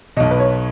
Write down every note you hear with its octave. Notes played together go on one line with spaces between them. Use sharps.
B1 B2 D#5
B4
C#5